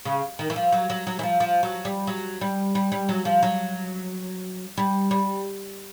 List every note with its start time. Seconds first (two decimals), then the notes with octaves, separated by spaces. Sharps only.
0.05 C#3
0.39 D#3
0.50 E3
0.56 F3
0.72 F#3
0.90 F#3
1.07 F#3
1.19 E3
1.23 F3
1.40 F3
1.63 F#3
1.85 G3
2.07 F#3
2.41 G3
2.75 G3
2.92 G3
3.09 F#3
3.25 F3
3.43 F#3
4.78 G3
5.11 G3